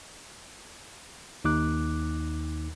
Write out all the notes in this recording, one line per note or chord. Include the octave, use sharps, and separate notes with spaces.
D#2 D#4 D6 F#6